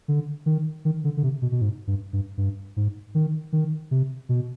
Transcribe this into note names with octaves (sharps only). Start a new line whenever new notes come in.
D3
D#3
D#3
D3
D3
C3
B2
B2
G#2
G2
G2
G2
G#2
D#3
D#3
C3
B2